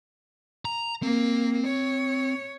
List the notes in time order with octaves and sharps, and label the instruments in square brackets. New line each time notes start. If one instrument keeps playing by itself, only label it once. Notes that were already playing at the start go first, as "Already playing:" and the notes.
[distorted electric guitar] A#5
[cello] A#3 [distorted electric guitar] C4
[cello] C#5